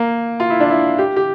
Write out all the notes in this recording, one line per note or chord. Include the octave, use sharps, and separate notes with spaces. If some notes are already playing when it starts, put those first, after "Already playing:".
Already playing: A#3
F4
E4
D4
E4
G4
G4